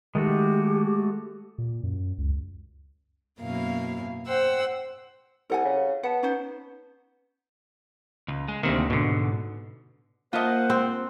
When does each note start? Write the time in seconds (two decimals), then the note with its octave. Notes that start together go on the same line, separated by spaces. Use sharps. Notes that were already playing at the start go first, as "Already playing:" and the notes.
0.15 D#3 G#3 A3 F#4 G4
1.58 A#2
1.83 F#2
2.18 C#2
3.40 F#2 B2 A#3 E4 F5
4.26 C5 F#5 G5 E6
5.50 C2 A4 F#5 G#5
5.65 C#3
6.03 B3 F#5 A5
6.23 C#4 D#4 C5
8.28 C#2
8.48 G#3
8.63 D2 C3 D#3 A#3 C4
8.90 G#2 B2 D3
10.33 A#3 F4 A#4 C5 D#5 E5 F#5 A5
10.70 C4